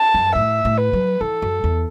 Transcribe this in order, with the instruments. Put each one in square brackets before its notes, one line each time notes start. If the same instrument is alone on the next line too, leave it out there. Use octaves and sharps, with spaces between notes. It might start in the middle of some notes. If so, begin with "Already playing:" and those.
Already playing: [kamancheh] A5
[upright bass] F#2
[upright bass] A2 [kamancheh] E5
[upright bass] A2
[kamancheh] B4
[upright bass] F#3
[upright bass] E3 [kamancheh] A4
[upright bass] F#2
E2